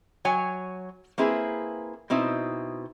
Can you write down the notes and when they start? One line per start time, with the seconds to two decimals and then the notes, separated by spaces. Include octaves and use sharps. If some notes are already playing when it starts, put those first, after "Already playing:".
0.25 F#3 C#5 G#5
1.18 A#3 C4 E4 G#4 B4
2.10 B2 C4 D#4 E4